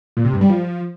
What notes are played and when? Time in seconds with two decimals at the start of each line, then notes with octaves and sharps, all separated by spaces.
0.17 A#2
0.25 C3
0.33 G2
0.41 G3
0.49 F3